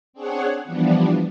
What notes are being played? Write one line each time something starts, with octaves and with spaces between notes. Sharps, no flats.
C4 D4 G#4 C#5 F#5
E3 F3 G3 B3 D4